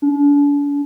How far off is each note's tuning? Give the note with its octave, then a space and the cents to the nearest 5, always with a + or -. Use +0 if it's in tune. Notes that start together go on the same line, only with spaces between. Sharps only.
D4 -40